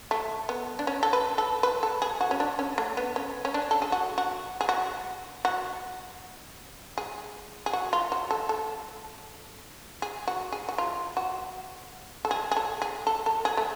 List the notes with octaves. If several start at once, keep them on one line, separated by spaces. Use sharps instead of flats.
A3
B3
D4
C#4
A4
B4
A4
B4
A4
G#4
F#4
C#4
D4
C#4
A3
B3
C#4
C#4
D4
A4
G#4
F#4
F#4
G#4
F#4
F#4
G#4
G#4
F#4
F4
F#4
A4
A4
G#4
F#4
G#4
F#4
F4
F#4
A4
G#4
G#4
A4
G#4
A4
A4
G#4
A3